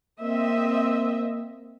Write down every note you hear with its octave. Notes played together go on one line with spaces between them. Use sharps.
A#3 C4 D#5 E5